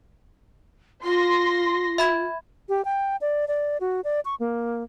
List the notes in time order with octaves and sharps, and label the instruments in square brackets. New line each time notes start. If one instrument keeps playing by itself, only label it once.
[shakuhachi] F4 [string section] C6 A#6
[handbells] E5 B5 G#6
[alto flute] G4
G5
D5
D5
F#4
D5
C#6
A#3